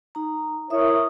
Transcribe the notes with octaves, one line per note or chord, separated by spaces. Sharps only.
D#4 A#5
E4 A#4 C#5 E5 D#6